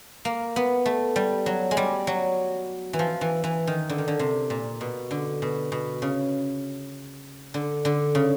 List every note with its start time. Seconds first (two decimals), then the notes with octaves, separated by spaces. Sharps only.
0.25 A#3
0.56 B3
0.86 A3
1.16 G3
1.46 F#3
1.71 G#3
1.77 G3
2.07 F#3
2.93 E3
2.99 F3
3.21 E3
3.44 E3
3.67 D#3
3.89 D3
3.98 D#3
4.08 D3
4.19 C3
4.50 A#2
4.81 B2
5.11 D3
5.42 B2
5.72 B2
6.02 C#3
7.54 D3
7.85 D3
8.15 C#3